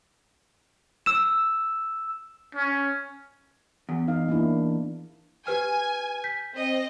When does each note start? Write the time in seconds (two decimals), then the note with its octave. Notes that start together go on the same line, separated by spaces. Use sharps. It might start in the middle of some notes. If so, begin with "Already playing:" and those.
1.06 E6 E7
2.55 C#4
3.89 E2
4.08 D#4 F5
4.28 A#3 D4 E4
5.47 G4 B4 G#5 F6
6.24 G6 B6
6.56 C4 D#5